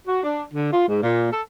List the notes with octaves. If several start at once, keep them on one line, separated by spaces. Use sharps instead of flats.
F#4
D4
D3
F4
G#2
A#2
A4